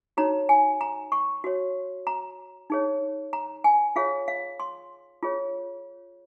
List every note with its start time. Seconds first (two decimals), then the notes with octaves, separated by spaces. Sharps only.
0.17 D#4 F#4 C#5 A#5
0.49 G#5
0.81 A#5
1.12 C#6
1.44 F#4 C#5
2.07 A#5
2.70 D#4 G#4 C#5
3.33 A#5
3.64 G#5
3.96 F4 G#4 C#5 F5
4.28 F5
4.60 C6
5.23 F4 G#4 C#5